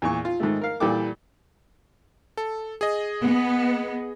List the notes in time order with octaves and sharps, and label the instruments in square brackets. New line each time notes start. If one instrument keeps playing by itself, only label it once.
[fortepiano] E2 A#2 C#6
F4
G#2 D#3 A3
A#4 F5
A#2 E3 G3 A4 G5 D6
[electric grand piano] A4
G#4 D#5
[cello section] B3